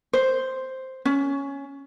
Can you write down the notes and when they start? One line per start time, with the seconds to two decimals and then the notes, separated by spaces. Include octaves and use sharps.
0.13 C5
1.05 C#4